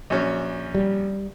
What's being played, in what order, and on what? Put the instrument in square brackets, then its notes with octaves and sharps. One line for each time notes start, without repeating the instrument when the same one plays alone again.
[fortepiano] A#1 F#3 C#4
[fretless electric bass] G3